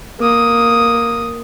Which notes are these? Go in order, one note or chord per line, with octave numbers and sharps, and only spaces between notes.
A#3 D#6